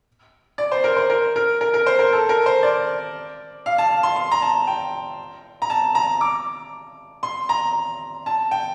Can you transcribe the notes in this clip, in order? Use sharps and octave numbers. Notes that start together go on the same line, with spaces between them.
D5
C5
A#4
C5
A#4
A#4
A#4
A#4
C5
A#4
A4
A#4
C5
D5
F5
A5
C6
C6
A#5
A5
G5
A#5
A5
A#5
D6
C6
A#5
A5
G5